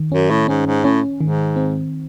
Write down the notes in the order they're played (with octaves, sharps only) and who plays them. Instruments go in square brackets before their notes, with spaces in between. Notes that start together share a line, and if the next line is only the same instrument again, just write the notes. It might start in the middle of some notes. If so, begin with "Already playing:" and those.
Already playing: [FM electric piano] D#3
[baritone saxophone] F#2 [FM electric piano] C#4
[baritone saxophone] A2
[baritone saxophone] G#2 [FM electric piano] C#4
[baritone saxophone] G#2
[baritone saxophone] A2 [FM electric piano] C#4
[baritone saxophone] G#2 [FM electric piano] D#3
[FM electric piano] C4